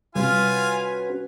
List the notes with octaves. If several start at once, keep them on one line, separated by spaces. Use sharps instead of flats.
C3 G3 C#4 F4 F#4 B4 F5 G#5